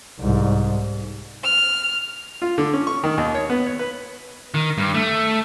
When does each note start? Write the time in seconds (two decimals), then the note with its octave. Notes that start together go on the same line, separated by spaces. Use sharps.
0.20 C2 G#2
1.43 F6
2.42 F4
2.58 D3
2.73 C#4
2.87 C#6
3.04 D#3
3.18 D#2
3.35 C#5
3.50 B3
3.67 C#5
3.79 B4
4.54 D#3
4.78 G2
4.94 A3